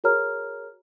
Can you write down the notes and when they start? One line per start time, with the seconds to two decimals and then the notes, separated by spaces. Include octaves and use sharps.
0.04 F#4 G#4 A#4 C#5 A#5 F6